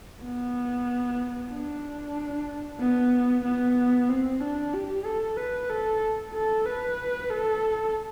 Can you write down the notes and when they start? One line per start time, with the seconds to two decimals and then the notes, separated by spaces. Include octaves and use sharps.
0.23 B3
1.51 D4
2.80 B3
3.44 B3
4.09 C4
4.40 D4
4.73 G4
5.05 A4
5.37 B4
5.69 A4
6.34 A4
6.65 B4
7.30 A4